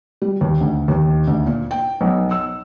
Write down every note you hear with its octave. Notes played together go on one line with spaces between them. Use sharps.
G3
D#2
D2
D#2
D2
A#2
G5
B1
E6